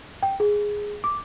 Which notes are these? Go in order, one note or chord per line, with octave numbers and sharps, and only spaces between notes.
G5
G#4
D6